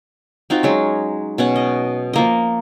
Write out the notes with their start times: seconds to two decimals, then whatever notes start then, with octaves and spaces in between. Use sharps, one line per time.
0.50 C4 D#4 F4 F#4
0.63 F#3 G#3 C#4
1.38 B2 C#4 F#5
1.56 D#5
2.13 F3 A#3 D#5